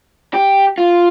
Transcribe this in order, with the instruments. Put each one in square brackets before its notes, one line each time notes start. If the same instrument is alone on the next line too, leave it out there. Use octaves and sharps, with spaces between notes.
[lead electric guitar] G4
F4